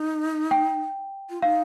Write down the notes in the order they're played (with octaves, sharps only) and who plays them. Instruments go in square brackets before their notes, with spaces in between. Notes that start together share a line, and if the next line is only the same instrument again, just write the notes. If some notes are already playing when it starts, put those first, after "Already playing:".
Already playing: [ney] D#4
[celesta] G5
[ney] F4
[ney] D#4 [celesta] F5